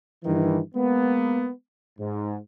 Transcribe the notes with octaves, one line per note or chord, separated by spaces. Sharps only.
G2 D#3 E3
G#3 A#3 B3
G#2